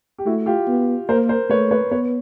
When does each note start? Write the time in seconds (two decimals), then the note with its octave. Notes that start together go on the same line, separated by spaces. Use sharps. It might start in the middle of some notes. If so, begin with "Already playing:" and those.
0.18 G4
0.25 A3 E4 F#4
0.46 F4 G4
0.67 B3
1.09 A#3 A#4 C5
1.29 A#4 C5
1.49 A3 B4 C#5
1.71 B4 C#5
1.91 B3 B4 C#5